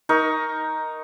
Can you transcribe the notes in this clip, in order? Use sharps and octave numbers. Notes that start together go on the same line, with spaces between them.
D#4 A#4 C#6